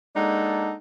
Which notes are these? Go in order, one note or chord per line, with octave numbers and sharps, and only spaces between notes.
G#3 A#3 D4 D#4 A4 F#5